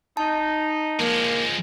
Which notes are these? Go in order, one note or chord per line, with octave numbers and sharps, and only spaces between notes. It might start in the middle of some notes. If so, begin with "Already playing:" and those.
D#4 A5
F3 G#3 A#3